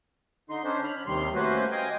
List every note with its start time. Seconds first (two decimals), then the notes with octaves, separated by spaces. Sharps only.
0.50 D3 D#4 C6
0.64 C#4 D4 C5
0.84 B5 F6
1.06 D#2 C3 D#3 G3 C6
1.35 A3 A#3 C#4 F#4 B4 C5
1.72 D#5 F5 G5 G#5 D#6